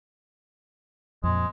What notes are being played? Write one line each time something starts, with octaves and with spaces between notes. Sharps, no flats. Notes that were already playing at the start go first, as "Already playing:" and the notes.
F2 A#2 G#3